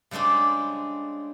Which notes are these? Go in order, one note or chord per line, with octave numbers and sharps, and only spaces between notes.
C#3 G3 G#3 C4 D4